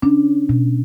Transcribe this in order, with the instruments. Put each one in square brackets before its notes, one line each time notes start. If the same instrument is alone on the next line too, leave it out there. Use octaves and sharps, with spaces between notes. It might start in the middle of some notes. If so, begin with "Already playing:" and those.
[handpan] C#4 [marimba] D4
[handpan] B2